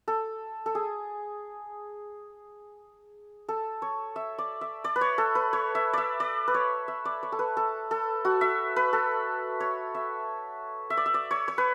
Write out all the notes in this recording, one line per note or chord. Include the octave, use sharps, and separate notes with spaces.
A4
A4
G#4
A4
C#5
E5
D5
E5
D5
B4
C#5
A4
B4
C#5
E5
D5 E5
D5
B4
C#5
E5
D5
C#5
A4
B4
A4
A4
F#4
E5
B4
A4
C#5
E5
E5
D5
E5
D5
C#5
C#5
B4